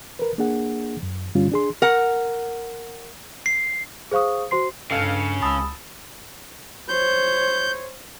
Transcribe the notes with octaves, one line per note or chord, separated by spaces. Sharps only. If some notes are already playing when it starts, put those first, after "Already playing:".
A#4 B4
A#3 D4 G#4 F#5
F#2
G2 D3 G3 C#4 F4
D4 G#4 C6
A#4 F#5
C7
G#4 C5 F5 C#6 D#6
F#4 C5 C6 C7
C#2 G2 C#3 A4 F5
C#2 A5 B5 D#6 E6
C5 C#5 G6